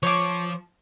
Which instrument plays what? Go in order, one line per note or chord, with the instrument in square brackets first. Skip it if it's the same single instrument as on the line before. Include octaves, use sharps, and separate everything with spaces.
[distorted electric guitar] F3 C5 [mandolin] C#5 C#6 D6